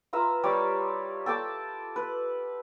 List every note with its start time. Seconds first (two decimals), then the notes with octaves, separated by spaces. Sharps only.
0.13 F4 B4 E5 A#5
0.44 G3 G4 C#5 D6
1.26 A4 G5 A5 D6
1.96 B4